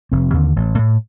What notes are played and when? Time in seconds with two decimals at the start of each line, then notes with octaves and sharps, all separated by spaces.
0.12 F1 C4
0.34 D#2 D3
0.56 A1
0.78 A2